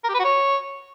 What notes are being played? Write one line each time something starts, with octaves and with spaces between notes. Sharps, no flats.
A#4
G4
B4
F#4
C#5